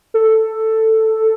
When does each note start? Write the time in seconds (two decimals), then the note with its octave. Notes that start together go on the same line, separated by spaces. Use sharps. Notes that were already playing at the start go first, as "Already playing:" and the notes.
0.14 A4